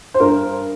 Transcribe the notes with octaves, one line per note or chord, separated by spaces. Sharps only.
C5
G2 A#4